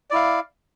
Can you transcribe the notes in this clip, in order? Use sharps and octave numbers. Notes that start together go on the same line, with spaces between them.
E4 D5 F5